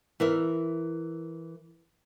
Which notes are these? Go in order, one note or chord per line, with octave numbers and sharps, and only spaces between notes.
E3 A#4 E5